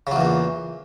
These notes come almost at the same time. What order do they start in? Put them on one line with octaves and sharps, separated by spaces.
C#3 F#3 E2 A#2